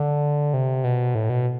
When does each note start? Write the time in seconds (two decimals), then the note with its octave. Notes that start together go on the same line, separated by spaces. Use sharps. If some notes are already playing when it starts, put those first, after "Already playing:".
Already playing: D3
0.53 C3
0.84 B2
1.15 A2
1.30 B2